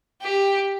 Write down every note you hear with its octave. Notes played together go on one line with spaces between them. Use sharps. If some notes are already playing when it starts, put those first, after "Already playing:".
G4